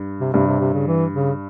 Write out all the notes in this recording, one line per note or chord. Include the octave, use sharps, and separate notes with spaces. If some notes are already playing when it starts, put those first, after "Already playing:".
Already playing: G2
C3
G2 C3
C3
C3
C#3
E3
C#3